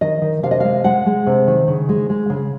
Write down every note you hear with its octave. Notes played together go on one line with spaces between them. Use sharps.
D#3 D#5
D#3
C3 F5
D#5
G#3 F5
G#3 F#5
G#3
C3
D#3
C#3
G#3
G#3
C#3